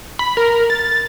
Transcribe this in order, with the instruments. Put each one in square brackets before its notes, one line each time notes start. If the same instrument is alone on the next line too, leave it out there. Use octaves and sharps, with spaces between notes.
[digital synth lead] B5
A#4
A6